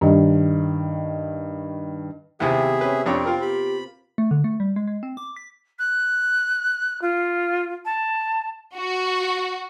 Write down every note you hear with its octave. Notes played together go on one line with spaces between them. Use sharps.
G2 D#3
D#2 C3 B3 E4 G#4 E5
C#4 B4
F2 C4 D4 C#5 G5
F4 A#4
G4 B5
A3
D3
A3
G3
G#3
G#3
C4
D6
B6
F#6
F4
A5
F#4